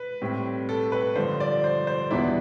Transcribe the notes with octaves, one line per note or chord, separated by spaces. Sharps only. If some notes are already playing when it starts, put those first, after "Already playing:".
Already playing: B4
A2 G3 C4
A4
B4
G2 D3 F3 C5
D5
C5
C5
E2 B2 G3 B3 D4 E4